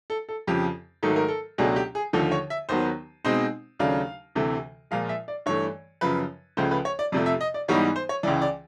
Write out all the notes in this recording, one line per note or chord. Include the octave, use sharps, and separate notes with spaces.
A4
A4
F2 C#3 F3 G4
G#2 D#3 F#3 A3 A4
A#4
A4
C#2 B2 F#3 A3 D4 G#4
G4
G#4
D#2 D3 F3 A3 A4
C#5
E5
D#2 D#3 F#3 B3 C5
B2 G#3 C4 D#4 C5
D#2 C#3 F#3 A3 D4 F5
D2 C3 E3 A3
A#2 F3 G#3 F5
E5
D5
G2 E3 A3 C#5
F#2 C#3 F3 B4
C#2 C#3 F3 A3 C5
B4
C#5
D5
F2 C3 F3 A3 D5
E5
D#5
D5
G#2 E3 G3 B3 D#4 C#5
C5
C#5
C#2 C#3 E3 D5
D5